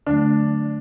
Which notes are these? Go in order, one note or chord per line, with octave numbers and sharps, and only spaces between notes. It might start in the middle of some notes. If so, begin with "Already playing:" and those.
D3 F#3 A3 D4